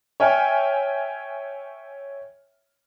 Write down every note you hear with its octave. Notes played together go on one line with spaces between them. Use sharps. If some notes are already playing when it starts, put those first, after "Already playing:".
C#5 E5 G5 G#5 F6